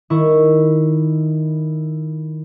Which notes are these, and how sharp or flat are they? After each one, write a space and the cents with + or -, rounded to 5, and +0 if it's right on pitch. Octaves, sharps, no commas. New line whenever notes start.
D#3 +0 E4 +0 C#6 +0